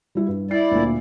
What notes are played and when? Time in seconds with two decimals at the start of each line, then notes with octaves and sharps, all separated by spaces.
0.15 G3 E4
0.28 G2
0.51 E4 D5 C7
0.71 D2 A#2